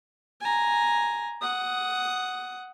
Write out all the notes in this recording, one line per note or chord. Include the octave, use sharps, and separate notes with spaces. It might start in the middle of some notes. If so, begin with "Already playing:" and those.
G#5 A#5
F#5 D#6